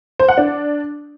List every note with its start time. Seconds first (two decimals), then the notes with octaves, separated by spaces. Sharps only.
0.19 C5
0.29 F#5
0.38 D4